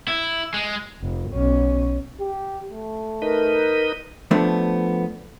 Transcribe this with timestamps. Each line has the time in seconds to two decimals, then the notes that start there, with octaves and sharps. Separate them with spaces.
0.08 E4
0.54 G#3
1.02 F1
1.31 B1 C#4
2.20 G4
2.70 A3
3.22 D#4 A#4 B4 D#5
4.31 F3 A3 B3 D4